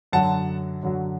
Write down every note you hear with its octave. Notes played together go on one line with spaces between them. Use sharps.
F#2 D3 F#3 F#5 A5
F#2 D3 F#3